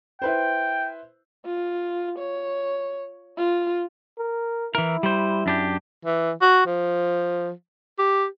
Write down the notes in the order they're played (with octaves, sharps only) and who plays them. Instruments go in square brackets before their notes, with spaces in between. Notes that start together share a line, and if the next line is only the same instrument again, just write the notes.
[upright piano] E4 B4 C5 [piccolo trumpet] G5
[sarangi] F4
C#5
F4
[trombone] A#4
[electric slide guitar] E3 A#4 [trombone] E4
[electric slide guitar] G3 C5
F#2 D4 G4
[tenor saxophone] E3
F#4
F3
G4